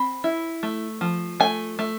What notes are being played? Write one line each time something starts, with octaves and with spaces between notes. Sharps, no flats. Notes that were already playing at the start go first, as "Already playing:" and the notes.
Already playing: C4 B5
E4
A3
F3
A3 G#5
A3